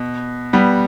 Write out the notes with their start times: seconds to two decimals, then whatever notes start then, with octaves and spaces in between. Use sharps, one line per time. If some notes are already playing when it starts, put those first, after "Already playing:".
Already playing: B2
0.53 G3 B3